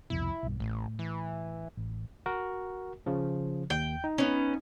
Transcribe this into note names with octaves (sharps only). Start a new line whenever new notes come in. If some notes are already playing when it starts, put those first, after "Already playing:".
C2 F2 B2 E4
B1 G2
A1 A2
E3
A1
F#4 A#4
C#3 F3
D#2 G5
D#4
B3 C#4